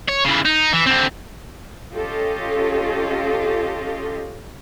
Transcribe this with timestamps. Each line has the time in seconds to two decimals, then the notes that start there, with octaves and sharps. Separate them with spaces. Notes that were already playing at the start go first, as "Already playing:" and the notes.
0.09 C#5
0.25 C#3 E3
0.45 D#4
0.73 E3
0.86 D3 C4
1.94 C#4 F4 G4 A4 D#5